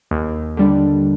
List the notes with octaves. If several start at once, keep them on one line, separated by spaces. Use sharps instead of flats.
D#2
D3 G3 D4